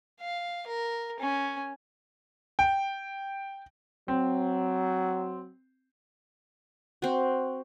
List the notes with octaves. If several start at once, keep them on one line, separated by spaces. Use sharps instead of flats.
F5
A#4
C#4
G5
F#3 C4
C4 F#4